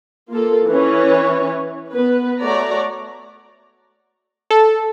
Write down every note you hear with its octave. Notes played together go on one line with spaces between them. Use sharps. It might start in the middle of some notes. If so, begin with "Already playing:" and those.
A#3 F4 A4
E3 C#4 B4 C#5
B3 B4
A3 F#4 C#5 D5 A#5
A4